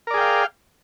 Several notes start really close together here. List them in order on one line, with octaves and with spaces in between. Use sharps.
A#4 D5 G#4 G5 F5